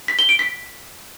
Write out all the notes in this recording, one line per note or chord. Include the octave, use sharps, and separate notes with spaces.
B6
G7
D7
B6